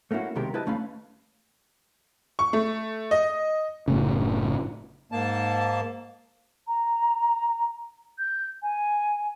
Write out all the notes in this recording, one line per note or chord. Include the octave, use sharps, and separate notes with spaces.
A3 A#3 C#4 E4 F#4
B1 C3 D#3 G#3 G4 A#4
E4 G4 B4 D#5 A5
D#2 A3 C#4 F5 B5
C#6
A3
D#5
F#1 A2 C#3
G#2 A#3 A5
A#5
G6
G#5